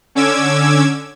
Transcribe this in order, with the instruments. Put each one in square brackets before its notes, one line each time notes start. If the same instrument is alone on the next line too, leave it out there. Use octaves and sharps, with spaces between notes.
[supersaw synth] D3 C#4 D6 E6 G#6